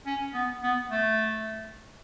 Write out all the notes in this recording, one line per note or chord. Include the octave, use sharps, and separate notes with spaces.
C#4
B3
B3
A3